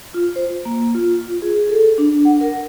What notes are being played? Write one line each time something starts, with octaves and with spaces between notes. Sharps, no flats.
F4
C5
A#3
F4
G#4
A4
D4
F#5
A#4